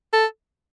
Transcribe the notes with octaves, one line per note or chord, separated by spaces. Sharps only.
A4